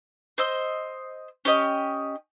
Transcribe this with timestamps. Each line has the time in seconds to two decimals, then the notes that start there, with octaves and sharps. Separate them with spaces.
0.38 C5 D#5 E6
1.45 C#4 G4 D#5